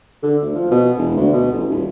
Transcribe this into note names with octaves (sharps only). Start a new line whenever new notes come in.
D3
D2
F3
B2
E1
D2
B2
A1
D#1